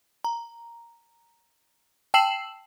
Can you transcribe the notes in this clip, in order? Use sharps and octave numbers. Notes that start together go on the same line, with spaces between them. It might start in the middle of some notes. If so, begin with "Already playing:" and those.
A#5
G5 A5 E6 C7 E7 F#7